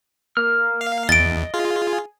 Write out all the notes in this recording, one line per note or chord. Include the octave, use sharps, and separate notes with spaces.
A#3 F6
F5
E2 D#5 A6 D7
F4 G#4